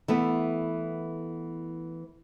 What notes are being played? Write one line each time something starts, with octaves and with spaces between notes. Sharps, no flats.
E3 A3 B3